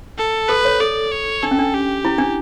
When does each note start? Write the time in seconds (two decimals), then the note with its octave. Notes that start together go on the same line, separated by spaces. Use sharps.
0.18 A4
0.49 A4 B4
0.65 C#5
0.80 A4 D5
1.12 C#5
1.43 D4 A4
1.51 C#4
1.59 D4
1.74 G4
2.05 E4
2.18 D4